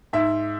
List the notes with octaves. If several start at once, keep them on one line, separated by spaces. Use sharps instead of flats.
G#2 E5